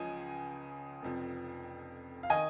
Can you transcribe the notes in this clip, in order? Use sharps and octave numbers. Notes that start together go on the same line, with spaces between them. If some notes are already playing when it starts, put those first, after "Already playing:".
Already playing: C#2 C#3 F3 D#5 G#5
F1 F2 F3
F5
D#3 D#5 G#5